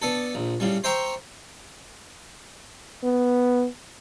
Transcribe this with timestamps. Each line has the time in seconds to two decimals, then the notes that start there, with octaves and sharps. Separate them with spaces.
0.02 B3 D4 A4
0.35 A#1
0.60 A2 C#3 G3
0.84 C5 E5 G5 A#5 C6 C#6
3.04 B3